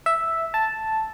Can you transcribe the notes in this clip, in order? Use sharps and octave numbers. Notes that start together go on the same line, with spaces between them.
E5
A5